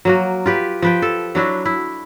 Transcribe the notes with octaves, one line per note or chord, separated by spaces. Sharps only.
F#3 A#3 F#4
F4 G4 B4
F3 B4 G5
A4
F#3 D4 E4 F#4
E4